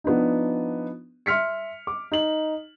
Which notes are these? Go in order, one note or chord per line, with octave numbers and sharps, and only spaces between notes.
F3 B3 D4 D#4
E5 C6 F6 B6 C#7
D6
D#4 F#7